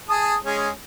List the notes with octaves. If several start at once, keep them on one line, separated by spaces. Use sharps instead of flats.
G#4 A5 D#6
G#3 C#4 G#4